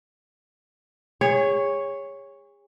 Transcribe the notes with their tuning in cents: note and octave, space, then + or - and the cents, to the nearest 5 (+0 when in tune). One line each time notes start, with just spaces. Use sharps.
G#4 -35 C#5 +0